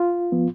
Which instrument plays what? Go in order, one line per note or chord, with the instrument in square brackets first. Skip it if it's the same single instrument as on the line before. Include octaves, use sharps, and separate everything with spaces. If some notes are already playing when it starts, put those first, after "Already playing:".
Already playing: [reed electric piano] F4
F3 B3